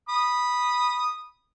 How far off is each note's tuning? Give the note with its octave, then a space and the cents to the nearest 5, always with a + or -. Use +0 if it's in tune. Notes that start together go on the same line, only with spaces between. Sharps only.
B5 -10 D#6 -10